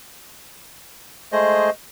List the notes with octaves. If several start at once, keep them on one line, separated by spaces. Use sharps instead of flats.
G#3 A3 G#4 C5 D#5